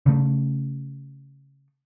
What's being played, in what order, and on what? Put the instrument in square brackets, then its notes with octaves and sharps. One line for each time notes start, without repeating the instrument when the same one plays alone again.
[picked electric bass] C#3 A3